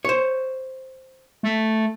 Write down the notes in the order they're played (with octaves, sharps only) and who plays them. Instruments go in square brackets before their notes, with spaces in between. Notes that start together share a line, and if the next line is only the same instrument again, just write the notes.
[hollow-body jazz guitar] C5 C#5
[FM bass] A3